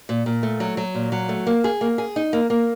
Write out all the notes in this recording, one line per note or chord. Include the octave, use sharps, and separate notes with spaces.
A#2
A#2
A3
F#3
F#3
A#2
F#3
A3
A#3
G#4
A#3
G#4
D#4
A#3
A#3